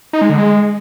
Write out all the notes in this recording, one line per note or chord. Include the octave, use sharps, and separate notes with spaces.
D#4
G#3
D3
G#3